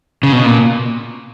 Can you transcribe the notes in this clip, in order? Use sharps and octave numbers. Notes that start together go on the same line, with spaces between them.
C#3
B2
A#2